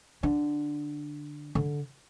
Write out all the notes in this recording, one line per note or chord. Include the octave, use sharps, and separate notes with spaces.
D3
D3